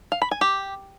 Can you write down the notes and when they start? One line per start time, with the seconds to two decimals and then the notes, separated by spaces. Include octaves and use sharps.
0.12 F5
0.22 B5
0.31 G#5
0.41 G4